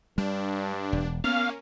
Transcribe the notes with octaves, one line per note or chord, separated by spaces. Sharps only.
G2 G3 D4
E1
A#3 B3 C#4 F5